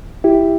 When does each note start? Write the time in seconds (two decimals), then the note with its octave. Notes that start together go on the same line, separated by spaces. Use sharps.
0.24 E4 G4